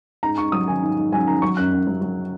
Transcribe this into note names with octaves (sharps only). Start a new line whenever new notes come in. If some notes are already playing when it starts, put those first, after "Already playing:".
G#2 A#5
G#2 C#6
F#3 D#6
D#3 G#5
G#2
G#2
F#3 G#5
D#3 A#5
F#3 C#6
F#2 F#6
F#2
F#3
F#3